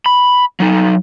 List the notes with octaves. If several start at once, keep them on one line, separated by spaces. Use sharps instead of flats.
B5
F#3 D#4